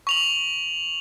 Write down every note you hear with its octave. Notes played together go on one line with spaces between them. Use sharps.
C#6 F7 F#7